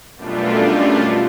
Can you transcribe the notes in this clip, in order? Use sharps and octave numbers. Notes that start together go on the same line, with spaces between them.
F#2 B2 G3 A3 D4 F4